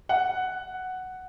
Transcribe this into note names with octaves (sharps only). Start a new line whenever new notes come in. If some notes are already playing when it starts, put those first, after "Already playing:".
F#5